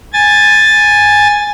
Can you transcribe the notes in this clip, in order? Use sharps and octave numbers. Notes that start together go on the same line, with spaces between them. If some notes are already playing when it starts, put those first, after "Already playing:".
G#5 A6